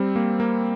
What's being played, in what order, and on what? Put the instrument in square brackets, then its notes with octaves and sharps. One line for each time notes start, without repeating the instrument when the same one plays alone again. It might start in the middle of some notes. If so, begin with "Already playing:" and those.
Already playing: [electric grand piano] G3 C4
A#3
A#3